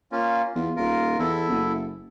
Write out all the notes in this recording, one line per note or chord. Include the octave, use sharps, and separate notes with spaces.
A#3 C#4 F4
E2 F4
D#1 F4 A#4
E2 E4 A4
F#1